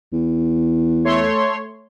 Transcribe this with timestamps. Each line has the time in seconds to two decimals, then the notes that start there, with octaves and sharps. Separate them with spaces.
0.12 E2
1.04 A3 C#5 C6